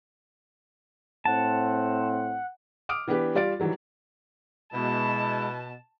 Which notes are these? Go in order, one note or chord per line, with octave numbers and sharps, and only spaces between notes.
A2 C4 F#5 A5
D6 D#6 F6 D7
E3 B3 D4 G4 B4
G3 F4 D5 A6 D7
D#3 E3 F#3 G3
B2 G#3 E4 A5